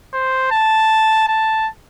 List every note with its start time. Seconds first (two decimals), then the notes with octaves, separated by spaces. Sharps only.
0.14 C5
0.51 A5
1.28 A5